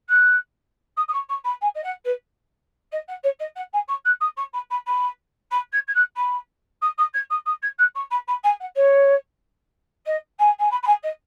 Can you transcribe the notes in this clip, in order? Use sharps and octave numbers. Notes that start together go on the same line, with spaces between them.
F#6
D#6
D#6
C#6
C#6
B5
G#5
D#5
F#5
B4
D#5
F#5
C#5
D#5
F#5
G#5
C#6
F#6
D#6
C#6
B5
B5
B5
B5
G#6
G#6
F#6
B5
D#6
D#6
G#6
D#6
D#6
G#6
F#6
C#6
B5
B5
G#5
F#5
C#5
D#5
G#5
G#5
B5
B5
G#5
D#5